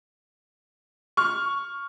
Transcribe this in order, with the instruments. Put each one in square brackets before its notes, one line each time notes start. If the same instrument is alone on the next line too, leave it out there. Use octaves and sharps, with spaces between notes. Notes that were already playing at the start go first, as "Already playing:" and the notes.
[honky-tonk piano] C#6 F6